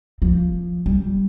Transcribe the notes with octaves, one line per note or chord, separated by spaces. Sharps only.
F3
G3